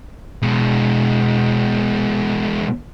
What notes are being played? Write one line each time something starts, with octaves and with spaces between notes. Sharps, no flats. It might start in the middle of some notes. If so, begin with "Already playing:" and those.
B2 G#3